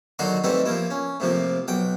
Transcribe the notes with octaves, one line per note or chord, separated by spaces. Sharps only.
D#2 D3 F#3 D#4 F#4 C6
E3 G3 A3 C4 D#4
F3 A#3 E4
C#4
A2 C3 F3 A#3
B1 F#5 G5